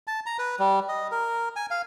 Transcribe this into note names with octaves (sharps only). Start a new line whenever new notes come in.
A5
A#5
B4
G3
D#5
A#4
G#5
F5